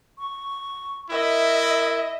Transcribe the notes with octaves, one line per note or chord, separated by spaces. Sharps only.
C#6
E4 A#4 D#5 E5